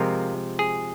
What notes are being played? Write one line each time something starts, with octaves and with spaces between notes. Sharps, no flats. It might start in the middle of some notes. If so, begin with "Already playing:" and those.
Already playing: C3 F3 G#3 C4 F4 A#4
G#4